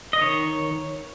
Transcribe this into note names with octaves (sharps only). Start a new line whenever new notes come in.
D#5
D#3 C#5